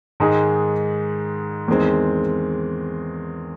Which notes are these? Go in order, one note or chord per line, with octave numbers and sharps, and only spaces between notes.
G#2 D#3 G#3 D#4 G#4
E2 D#3 G#3 C4